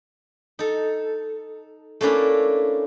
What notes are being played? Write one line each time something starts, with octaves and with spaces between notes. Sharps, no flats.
D#4 A4
A3 A#3 C#4 D4 E4 A#4